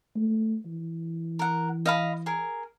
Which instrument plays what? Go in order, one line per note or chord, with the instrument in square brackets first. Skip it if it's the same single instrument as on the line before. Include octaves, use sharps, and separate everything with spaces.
[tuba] A3
E3
[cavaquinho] A#4 F#5
D#5 F5 B5
G#4 A#4